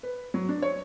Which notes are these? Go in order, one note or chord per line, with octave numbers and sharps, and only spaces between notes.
B4
F#3
D4
C#5